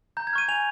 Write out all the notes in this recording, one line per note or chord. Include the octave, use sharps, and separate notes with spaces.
A#5 G6
G#6
C#6 F6 D#7
G#5 F7